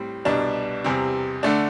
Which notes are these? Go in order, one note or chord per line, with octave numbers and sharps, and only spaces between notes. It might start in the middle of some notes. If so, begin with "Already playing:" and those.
Already playing: A2 G3 C4
C2 B2 G3 D4
E2 C3 G3 C4
D3 A3 D4